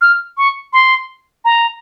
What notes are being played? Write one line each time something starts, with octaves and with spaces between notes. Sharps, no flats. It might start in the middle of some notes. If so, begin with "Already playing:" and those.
F6
C#6
C6
A#5